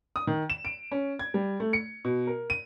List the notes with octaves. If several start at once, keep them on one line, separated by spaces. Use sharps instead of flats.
D#6
D#3
E7
D7
C#4
G#6
G3
A3
C#7
B2
A#4
D#7